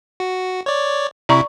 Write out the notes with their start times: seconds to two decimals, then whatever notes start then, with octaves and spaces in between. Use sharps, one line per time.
0.20 F#4
0.66 C#5 D5
1.29 C3 E4 D5 A#5 C#6